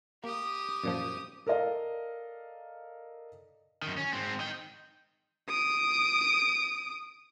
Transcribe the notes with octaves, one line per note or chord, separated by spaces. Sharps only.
A#3 G4 D#6
F#2 A#2 F3
A4 A#4 D5 D#5 F5
F#2 D#3
C#4
G#2 C4
D#4 G5
D#6 D7